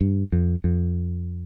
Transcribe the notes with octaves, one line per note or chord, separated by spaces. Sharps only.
G2
F2
F2